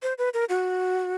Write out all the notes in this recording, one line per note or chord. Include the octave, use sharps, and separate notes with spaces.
C5
B4
A#4
F#4